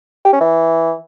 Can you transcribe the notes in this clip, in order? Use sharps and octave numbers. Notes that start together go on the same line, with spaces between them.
G4
C#4
E3